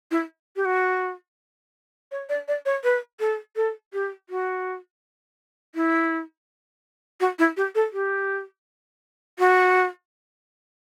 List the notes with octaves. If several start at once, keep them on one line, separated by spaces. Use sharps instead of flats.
E4
G4
F#4
C#5
D5
D5
C#5
B4
A4
A4
G4
F#4
E4
F#4
E4
G4
A4
G4
F#4